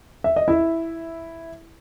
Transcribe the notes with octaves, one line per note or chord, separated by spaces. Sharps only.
E5
D#5
E4 E5